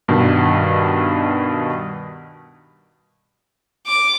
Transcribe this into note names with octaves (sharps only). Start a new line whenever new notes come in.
G2 B2 D#3
D6